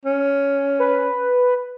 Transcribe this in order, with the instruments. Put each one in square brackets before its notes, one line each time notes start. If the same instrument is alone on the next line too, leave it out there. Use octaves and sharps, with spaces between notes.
[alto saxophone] C#4
[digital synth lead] B4